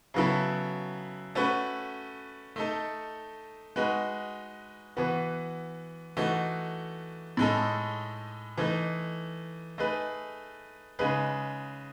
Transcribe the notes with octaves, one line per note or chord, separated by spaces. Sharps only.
C#3 F#3 B3 E4 A4
A3 C#4 F#4 B4
A3 D#4 A4
G#3 D#4 F#4 B4
E3 B3 F#4
E3 A3 D#4 F#4
A2 G#3 D#4 A4
E3 A3 D#4
A3 D#4 G#4 B4
C#3 G#3 D#4 G#4 B4